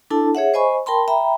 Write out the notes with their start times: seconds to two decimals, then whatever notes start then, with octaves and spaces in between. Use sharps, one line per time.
0.11 D4 E4 A4 A5
0.35 G#4 C#5 E5 F#5
0.54 C5 D#5 G#5 B5 C#6
0.86 A#4 G5 A5 B5 C6
1.08 E5 G5 A#5 B5